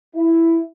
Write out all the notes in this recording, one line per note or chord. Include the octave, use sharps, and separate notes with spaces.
E4